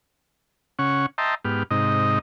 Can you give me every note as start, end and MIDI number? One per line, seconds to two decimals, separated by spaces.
0.79 1.06 49
0.79 1.06 61
0.79 1.06 78
0.79 1.06 85
1.18 1.35 75
1.18 1.35 76
1.18 1.35 79
1.18 1.35 81
1.18 1.35 82
1.18 1.35 84
1.45 1.63 44
1.45 1.63 59
1.45 1.63 67
1.45 1.63 89
1.71 2.19 44
1.71 2.19 48
1.71 2.19 63
1.71 2.19 75